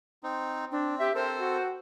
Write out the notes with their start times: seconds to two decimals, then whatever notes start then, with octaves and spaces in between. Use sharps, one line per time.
0.23 C4 D#4
0.72 C4 D4
1.00 G4 E5
1.15 C4 A4 A#4 C5
1.38 F#4